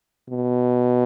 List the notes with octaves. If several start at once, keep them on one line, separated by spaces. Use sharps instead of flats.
B2